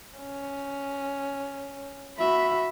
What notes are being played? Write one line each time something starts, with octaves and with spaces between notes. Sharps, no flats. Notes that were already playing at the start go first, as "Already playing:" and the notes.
C#4
F#4 E5 B5